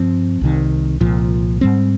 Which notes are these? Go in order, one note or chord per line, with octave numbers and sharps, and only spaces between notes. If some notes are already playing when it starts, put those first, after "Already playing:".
Already playing: G2 F3 C4
C2 C3 D#3
C2 A#2 F3
G#2 G3 C4